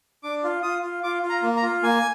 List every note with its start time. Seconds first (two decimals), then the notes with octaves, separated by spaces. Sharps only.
0.23 D4 D6
0.44 F4
0.63 F4 D#6
0.82 F4
1.03 F4 D6
1.23 F4
1.30 A#5
1.42 A#3
1.57 A#5
1.62 F4
1.83 A#3 G#5